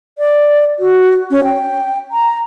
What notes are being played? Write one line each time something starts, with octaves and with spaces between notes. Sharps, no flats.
D5
F#4
C#4
G5
A#5